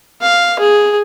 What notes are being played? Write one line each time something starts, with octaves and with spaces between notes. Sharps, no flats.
F5
G#4